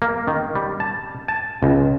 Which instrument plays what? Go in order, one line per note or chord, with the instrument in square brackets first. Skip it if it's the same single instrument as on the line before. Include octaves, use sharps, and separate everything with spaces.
[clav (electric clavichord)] A#3
D#3
G3
A5
A5
C#2